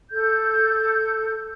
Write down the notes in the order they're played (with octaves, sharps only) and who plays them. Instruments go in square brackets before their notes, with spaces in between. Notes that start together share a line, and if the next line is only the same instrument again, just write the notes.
[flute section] A4 G6